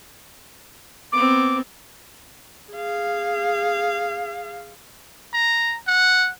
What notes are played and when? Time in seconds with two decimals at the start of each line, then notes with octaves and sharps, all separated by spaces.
1.12 B3 C4 D6
2.73 G#4 F5
5.34 A#5
5.87 F#5